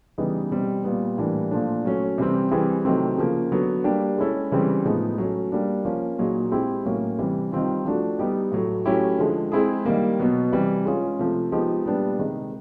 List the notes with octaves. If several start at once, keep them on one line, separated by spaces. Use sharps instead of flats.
C#3 E3 G3 B3 D#4
B2 G3 C4
A#2 G3 B3
A2 E3 G3 A#3 D4
A#2 F3 A3 D4
F#3 A3 C#4
C3 E3 G3 C4
E3 G3 C4 E4 G#4
C3 D#3 F#3 A3 C4
C#3 F3 A#3
D3 F#3 B3
G3 A#3 D4 G4
G#3 C#4 E4 A4
C#3 E3 G3 C4
A2 F3 G#3 B3 D#4
F#3 A3 C#4
G3 A#3 D4
F3 A#3 C#4
A#2 F#3 A#3 D#4 G#4
G#3 C4 E4 G4
A2 F#3 A#3 C#4 F#4
C3 E3 G3
D#3 G3 C4 F4
F3 A3 D4 F#4
G3 B3 D#4 G4
A2 F#3 A3
F#3 A3 C#4 E4 G4
D3 F3 G#3
G#3 C4 E4 G#4
D#3 G3 A#3
B2 F#3 B3
C3 E3 G3
G#3 C#4 F4 G#4
C3 F3 A3
F3 G#3 B3 D#4 G4
A#2 G3 B3 D4 G4
C3 D#3 G#3